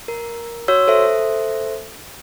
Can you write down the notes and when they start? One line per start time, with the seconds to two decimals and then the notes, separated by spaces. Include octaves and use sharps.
0.08 A#4
0.68 F#4 C#5 E6
0.87 A4 C5 E5